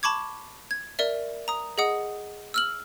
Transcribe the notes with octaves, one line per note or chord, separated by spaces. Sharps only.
A5 B5 C#6 D6 G#6
G#6
A#4 D5 E5
A#5 D#6
G#4 D#5 F#5 D#6
E6 F6 F#7